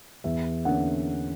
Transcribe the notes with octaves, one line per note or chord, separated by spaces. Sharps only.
E2 E5
D3 A#3 C#4 F#5